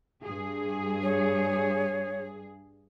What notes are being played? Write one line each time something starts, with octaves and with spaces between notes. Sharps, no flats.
G2 G#4
C#5